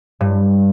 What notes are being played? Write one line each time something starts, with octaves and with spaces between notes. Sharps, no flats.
G2